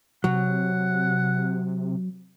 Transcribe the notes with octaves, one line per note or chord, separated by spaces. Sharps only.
C3 F#3 F#5